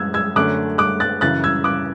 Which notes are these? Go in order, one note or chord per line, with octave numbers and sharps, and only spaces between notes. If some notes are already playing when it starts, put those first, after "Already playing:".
Already playing: F#2 E3 G#3 E6 F#6 G#6
E6 G#6
F#2 D3 A3 C#4 D6 F#6
D6 F#6
F#6 A6
F#2 C#3 E3 F#6 A6
E6 G#6
D6 F#6